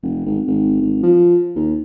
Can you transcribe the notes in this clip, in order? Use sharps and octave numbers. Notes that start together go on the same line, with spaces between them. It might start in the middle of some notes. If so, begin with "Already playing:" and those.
F1
G#1
G#1
G#1
F3
D#2